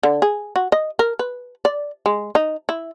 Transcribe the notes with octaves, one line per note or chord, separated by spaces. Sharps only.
D3
G#4
F#4
D#5
A#4
B4
D5
G#3
D#4
E4